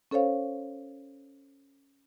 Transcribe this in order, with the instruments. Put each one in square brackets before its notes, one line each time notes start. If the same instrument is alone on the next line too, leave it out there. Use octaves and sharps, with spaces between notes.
[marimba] C#4 A4 C5 C#5 F5